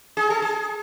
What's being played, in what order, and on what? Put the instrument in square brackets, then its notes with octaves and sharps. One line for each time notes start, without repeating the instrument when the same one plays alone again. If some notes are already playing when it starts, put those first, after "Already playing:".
[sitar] G#4
A4
G#4